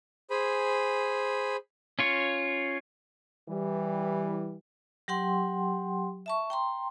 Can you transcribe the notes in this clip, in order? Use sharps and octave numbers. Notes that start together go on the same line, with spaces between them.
G#4 C5 G#5 B5
C#4 F4 C#5
E3 G3
F#3 G4 F#5 G5 C6
E5 A5 C#6
G5 A#5 C6